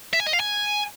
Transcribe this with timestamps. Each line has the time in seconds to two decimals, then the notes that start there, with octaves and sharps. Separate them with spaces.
0.13 E5
0.20 G#5
0.26 D#5
0.33 F5
0.40 G#5